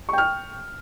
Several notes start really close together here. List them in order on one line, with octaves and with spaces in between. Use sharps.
C#6 G5 F6